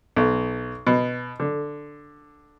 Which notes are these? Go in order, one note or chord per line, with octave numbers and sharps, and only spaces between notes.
B1
B2
D3